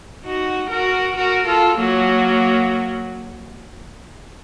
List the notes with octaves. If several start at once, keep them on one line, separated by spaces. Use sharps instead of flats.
D#4 F#4
F#4 A#4
F#4 A#4
F4 A4
F#3 A#3